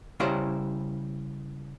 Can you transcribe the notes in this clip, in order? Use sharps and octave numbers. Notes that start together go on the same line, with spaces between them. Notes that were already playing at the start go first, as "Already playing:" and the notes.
C#3 G3 E4 C5 D5 A#5